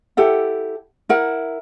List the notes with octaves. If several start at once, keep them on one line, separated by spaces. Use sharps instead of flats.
E4 G4 A4 F#5
E4 A#4 F#5